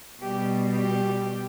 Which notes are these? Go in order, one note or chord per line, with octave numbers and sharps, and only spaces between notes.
B2 G3 G4
G4